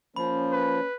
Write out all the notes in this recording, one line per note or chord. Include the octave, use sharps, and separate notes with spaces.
F3 A#3 C#4 B5
B4